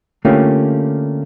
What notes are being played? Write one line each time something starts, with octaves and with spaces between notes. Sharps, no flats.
D3 A3 A#3 C#4 F4 G4